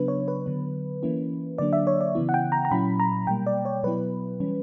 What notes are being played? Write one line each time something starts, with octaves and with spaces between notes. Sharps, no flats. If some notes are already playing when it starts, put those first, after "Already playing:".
Already playing: C#3 F#3 B3 D4 B4
C#5
B4
D3 F#3 B3
E3 A#3 C#4 E4
D3 F#3 A#3 D4 D5
E5
C#5
D5
C#3 E3 B3 E4
F#5
G5
A#5
A#5
A#2 F#3 C#4 E4 B5
A#5
B2 G3 A#3 G5
D5
C#5
B2 F#3 B3 E4 B4
E3 G3 C#4